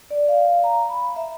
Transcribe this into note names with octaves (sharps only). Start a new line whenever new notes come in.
D5
F5
A#5
B5
E5